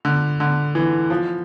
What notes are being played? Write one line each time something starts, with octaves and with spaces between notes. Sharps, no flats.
D3
D3
E3
F3